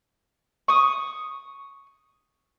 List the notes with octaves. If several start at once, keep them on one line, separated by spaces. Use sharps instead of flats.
C#6 D#6